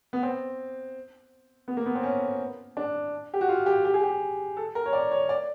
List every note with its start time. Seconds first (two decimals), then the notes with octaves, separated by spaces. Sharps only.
0.13 B3
0.23 C4
1.68 B3
1.77 A#3
1.86 B3
1.95 C4
2.03 C#4
2.77 D4
3.34 G4
3.41 F#4
3.49 F4
3.66 G4
3.85 G4
3.94 G#4
4.03 G4
4.57 A4
4.75 A#4
4.86 C#5
4.93 D5
5.11 C#5
5.29 D5